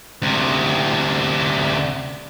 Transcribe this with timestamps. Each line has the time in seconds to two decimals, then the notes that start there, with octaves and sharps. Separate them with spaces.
0.22 D2 C3